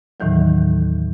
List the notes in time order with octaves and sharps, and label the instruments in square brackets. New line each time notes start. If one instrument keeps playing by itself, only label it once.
[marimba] D#2 A2 D#3 E3 F#3